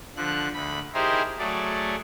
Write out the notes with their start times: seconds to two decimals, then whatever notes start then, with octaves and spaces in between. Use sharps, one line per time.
0.16 D3 F3 F#6
0.54 D2 B5
0.94 D#4 E4 G4 G#4 A#4 C5
1.39 F#3 A3 G#4 D5